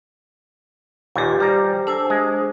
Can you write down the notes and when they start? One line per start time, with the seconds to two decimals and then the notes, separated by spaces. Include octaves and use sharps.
1.16 D#2 A#2 G4 B4 G#5
1.40 G3 G4 C5 A#5
1.87 D4 A4 C5 G#5
2.10 G#3